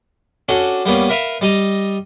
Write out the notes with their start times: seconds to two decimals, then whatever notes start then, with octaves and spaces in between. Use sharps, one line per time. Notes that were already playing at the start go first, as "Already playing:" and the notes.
0.49 C#4 D4 F#4 A4
0.85 G3 A#3 B3 C#4
1.09 A#4 B4 E5 F5
1.41 G3 D#5 A#5